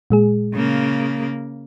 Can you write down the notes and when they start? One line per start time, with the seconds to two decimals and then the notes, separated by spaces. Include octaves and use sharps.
0.10 A#2 G#3 G#4
0.54 C#3 A#3